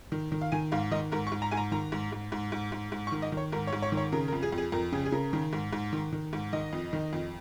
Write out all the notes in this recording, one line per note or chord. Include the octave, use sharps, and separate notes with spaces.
D#3
D#3
F5
D#3 G#5
G#2 F5
D#3 D#5
G#2 A#4
C#6
G#2
A#5
G#2 G#5
A#5
D#3 A#5
G#2
G#2
G#2
G#2
G#2
G#2
C#6
D#3
D#5
D#3 C#5
G#2 A#4
C#5
G#2
C#5
D#3
C#5
C#3 A#4
A#4
F2
G#4
F2
G#4
F2 A#4
C#3 G#4
G#4
C#3 A#4
D#3
G#2
G#2
D#3
D#3
G#2
D#3 D#5
F2
D#3
F2